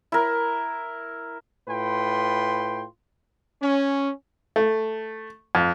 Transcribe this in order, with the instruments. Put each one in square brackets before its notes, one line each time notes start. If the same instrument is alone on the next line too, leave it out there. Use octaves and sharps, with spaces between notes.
[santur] E4 A#4
[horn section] A2 F4 B4 G5 C6
C#4
[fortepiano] A3
F2